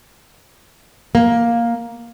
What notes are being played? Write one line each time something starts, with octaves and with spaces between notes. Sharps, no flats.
A#3